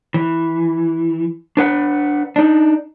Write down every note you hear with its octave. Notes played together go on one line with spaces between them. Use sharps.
E3
D4 B4 F#5
D4 D#4